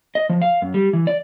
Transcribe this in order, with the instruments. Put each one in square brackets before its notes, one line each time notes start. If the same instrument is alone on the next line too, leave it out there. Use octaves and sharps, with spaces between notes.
[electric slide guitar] D#5
F3
F5
F#2
G3
E3
D5